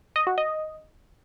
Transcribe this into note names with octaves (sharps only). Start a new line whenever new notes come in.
D#5
F#4
D#5